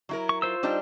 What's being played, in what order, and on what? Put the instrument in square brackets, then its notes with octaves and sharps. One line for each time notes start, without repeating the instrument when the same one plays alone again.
[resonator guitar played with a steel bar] F#3 E4 A#4
[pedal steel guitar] C#6
F4 C5 E6
[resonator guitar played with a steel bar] G3 D4 D#4